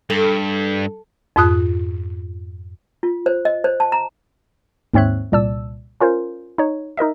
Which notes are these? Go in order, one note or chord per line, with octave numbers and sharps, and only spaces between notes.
G2 A4
F2 G#2 F4 D#6 F#6
F4
C5
D#5
C5
A5
A#5
D#2 G#2 C4 C#5 E5 F#6
C2 A#2 D5 A5 E6
C#4 F4 A#4 C5
D#4 C#5
D#4 A#4 D#5 E5